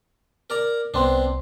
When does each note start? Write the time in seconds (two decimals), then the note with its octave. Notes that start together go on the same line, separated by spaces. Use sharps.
0.50 A#4 D5 A#5
0.94 C2 B3 C4 D4 C5 C6